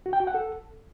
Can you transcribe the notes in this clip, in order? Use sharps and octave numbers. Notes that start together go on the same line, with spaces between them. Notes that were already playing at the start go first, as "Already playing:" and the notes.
F#4
G5
F#4
F#5
A4